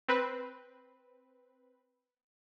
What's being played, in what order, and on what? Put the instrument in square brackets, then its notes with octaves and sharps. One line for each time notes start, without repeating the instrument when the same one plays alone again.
[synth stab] C4 B4